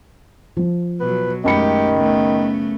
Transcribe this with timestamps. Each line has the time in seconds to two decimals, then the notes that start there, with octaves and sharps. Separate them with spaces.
0.57 F3
1.00 B2 F#3 B4
1.44 F#2 D#3 G#3 A3 G4 B5 C#7
1.95 C#3 A3 B3